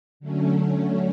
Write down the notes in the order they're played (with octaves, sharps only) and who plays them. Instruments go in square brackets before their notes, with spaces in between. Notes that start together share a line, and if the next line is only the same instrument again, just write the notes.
[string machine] D3 F#3 A3 C#4